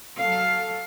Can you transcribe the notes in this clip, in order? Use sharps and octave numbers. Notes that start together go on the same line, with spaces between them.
F#3 A4 F5